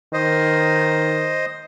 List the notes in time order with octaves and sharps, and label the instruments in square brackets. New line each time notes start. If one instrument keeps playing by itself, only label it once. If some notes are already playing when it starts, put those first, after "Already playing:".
[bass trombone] D#3 [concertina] C5 D#5